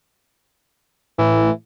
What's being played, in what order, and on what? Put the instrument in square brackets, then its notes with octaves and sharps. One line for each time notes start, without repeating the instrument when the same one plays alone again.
[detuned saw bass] A2 [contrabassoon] E3